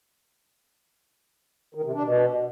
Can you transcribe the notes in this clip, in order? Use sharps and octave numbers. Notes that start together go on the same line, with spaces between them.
D#3
C3
D4
B2